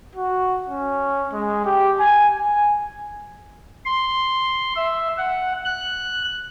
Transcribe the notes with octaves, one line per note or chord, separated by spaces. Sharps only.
F#4
C#4
G#3
G4
G#5
G#5
C6
E5
F#5
F#6